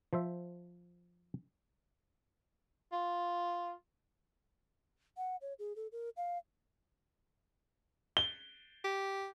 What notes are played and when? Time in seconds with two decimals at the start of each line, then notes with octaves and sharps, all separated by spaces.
0.13 F3 C5 E5
2.92 F4
5.17 F#5
5.42 C#5
5.59 G#4
5.76 A4
5.92 A#4
6.17 F5
8.17 G7
8.84 G4